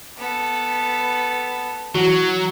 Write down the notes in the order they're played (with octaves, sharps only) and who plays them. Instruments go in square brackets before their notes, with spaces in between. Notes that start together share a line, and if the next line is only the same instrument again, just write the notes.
[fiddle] B3 A4
[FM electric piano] E3 F#4 [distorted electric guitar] F#3